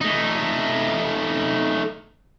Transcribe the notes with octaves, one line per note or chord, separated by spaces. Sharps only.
A3 D#4